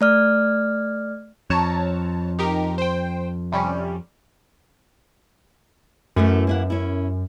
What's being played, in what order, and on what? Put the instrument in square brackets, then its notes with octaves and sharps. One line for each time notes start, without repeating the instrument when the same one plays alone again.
[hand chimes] A3 D5 F6
[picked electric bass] F2 [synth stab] C#5 A5 A#5
[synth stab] D#4 G4 A#4
C5 G5
C3 G3 C#4
[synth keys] F#2 [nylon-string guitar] E3 A3 F#4
[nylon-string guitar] A#3 E4 F#5
C#4 E4